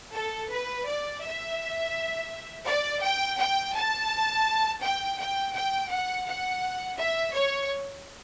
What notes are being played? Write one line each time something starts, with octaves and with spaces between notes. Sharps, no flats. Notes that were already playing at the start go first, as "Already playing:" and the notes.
A4
B4
D5
E5
D5
G5
G5
A5
G5
G5
G5
F#5
F#5
E5
C#5